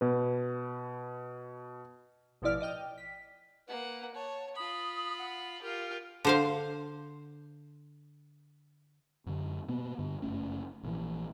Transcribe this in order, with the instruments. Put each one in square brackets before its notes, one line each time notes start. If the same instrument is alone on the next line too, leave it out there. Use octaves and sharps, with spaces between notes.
[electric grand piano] B2 B4
[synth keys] A1 B2 F3 E4 D5 F6
D5 D#5 G5 F6
B6
[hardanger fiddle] A#3 F#5 [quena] B4
[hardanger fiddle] C#5 [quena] A5
[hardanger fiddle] F4 B5 [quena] D#6
[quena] F#5
[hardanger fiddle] F4 G4 [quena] A#4
[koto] D3 C5 F5
[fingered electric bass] F#2 D3
B2 A#3 B3
G2 D3
F#1 A3 C#4
A#1 A#2 D#3 E3